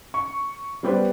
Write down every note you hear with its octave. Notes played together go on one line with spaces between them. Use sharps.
C#6
G3 B3 G4 B4 C5 D5